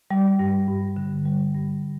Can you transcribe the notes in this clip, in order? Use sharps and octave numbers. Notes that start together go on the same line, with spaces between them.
G3
G2
G2
D3
G3
G2